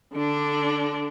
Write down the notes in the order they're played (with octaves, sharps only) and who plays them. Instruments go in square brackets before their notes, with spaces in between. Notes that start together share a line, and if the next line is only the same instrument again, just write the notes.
[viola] D3 D4